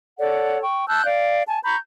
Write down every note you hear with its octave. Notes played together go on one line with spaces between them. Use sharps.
A4 C#5 D5 F#5
G5 C#6
A5 E6 F#6 G6
D5 F5
G#5 A5
A#5 B5 C#6 G6